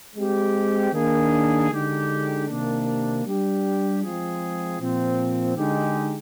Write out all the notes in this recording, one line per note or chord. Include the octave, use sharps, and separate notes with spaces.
G#3 C4 G4
D#3 A#3 D4 G#4
D3 G#3 D#4 G4
C3 D#3 A#3 D4
G3 D4 G4
F3 G#3 C4 F4 G#4
A#2 F3 C4
D3 G#3 D#4 G4